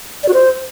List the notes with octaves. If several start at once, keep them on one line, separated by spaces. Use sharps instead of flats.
D5
F#4
C5